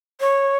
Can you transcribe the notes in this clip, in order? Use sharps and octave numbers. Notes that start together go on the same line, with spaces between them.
C#5